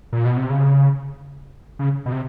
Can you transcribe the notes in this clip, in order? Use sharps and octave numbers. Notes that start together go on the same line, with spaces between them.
A#2
B2
C3
C#3
C#3
B2
C3